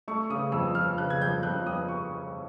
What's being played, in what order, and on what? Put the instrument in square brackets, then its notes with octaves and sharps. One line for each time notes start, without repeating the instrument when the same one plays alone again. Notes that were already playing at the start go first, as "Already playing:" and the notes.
[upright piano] A3 C#6
C#3 D#6
F2 E6
F3 F6
C#3 F#6
G#6
F2 G6
F2 F#6
F2 D#6
C#6